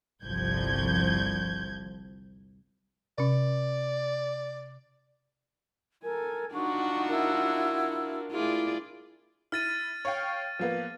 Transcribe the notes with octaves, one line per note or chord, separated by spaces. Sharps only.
G1 C2 F3 G6 G#6
C3 C#4 D5
A4 A#4 G#5
D4 D#4 F4 F#4 F#5 C#6
E4 A#4
A3 E4 F4 G#4 D5
E4 F6 A6 D#7
C#5 F5 G5
F3 A#3 B3